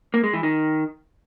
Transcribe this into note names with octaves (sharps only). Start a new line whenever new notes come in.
A#3
G#3
E3
D#3